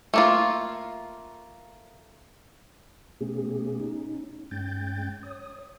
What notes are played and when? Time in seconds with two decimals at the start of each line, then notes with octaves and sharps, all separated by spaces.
0.14 A3 A#3 F4
3.21 B2 A3 B3 C#4 G4 G#4
3.80 C#4 D#4
4.51 G2 G#3 C#4 G5 G6 A6
5.23 C#5 D#6